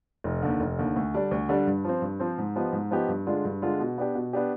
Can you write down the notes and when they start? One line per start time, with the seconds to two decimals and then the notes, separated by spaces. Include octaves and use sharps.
0.24 F1
0.42 D#2 D3
0.60 F1
0.78 D#2 D3
0.96 D2
1.14 D3 G3 D4
1.31 D2
1.49 D3 G3 D4
1.67 G2
1.84 F3 C4
2.02 G2
2.20 F3 C4
2.38 G#2
2.56 F3 B3 D#4 G4
2.73 G#2
2.91 F3 B3 D#4 G4
3.09 G2
3.26 D3 G#3 D4 F4
3.45 G2
3.62 D3 G#3 D4 F4
3.80 B2
3.98 B3 D4 G4
4.15 B2
4.33 B3 D4 G4